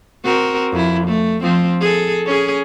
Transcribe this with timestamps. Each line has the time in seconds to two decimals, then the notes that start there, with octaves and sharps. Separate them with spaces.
0.24 C4 F#4 A#4
0.72 F2 E4
1.07 A3
1.42 F3 C4
1.81 G#4 A4
2.26 C#4 G#4